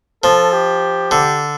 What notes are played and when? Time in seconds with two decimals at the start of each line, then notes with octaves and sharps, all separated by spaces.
0.23 F3 A4
0.53 G4
1.11 D3